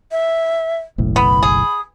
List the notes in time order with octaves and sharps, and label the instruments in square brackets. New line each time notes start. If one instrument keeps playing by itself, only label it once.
[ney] E5
[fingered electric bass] F#1 B1 A2
[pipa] B3 [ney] B5
[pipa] G#4